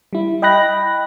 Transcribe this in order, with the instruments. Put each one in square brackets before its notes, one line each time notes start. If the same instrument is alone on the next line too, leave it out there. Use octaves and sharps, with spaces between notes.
[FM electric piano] G3 E4
D#5 G5 B5 F#6 A#6